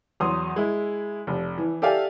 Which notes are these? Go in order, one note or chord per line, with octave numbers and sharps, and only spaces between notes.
E2 F#3 C6 D#6
G#3 E4
F1
E3
G4 A4 D5 E5 F5 G#5